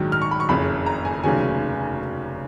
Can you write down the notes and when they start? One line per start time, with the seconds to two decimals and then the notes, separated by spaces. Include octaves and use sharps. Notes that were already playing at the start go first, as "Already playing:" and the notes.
Already playing: A#1 G#2 D#3 F#3
0.12 F6
0.22 C#6
0.31 B5
0.40 C#6
0.49 F#1 F2 C#3 B5
0.86 A#5
1.05 G#5
1.24 F1 D#2 C#3 F#3 G#5